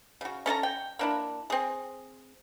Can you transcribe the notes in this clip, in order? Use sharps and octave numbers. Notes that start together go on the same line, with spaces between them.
C#3 F#4
C#4 A4 E5 A#5
G5
A#3 D4 E4
C4 G#4